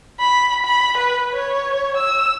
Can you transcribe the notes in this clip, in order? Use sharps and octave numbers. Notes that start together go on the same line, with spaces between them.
B5
B5
B4
C#5
E6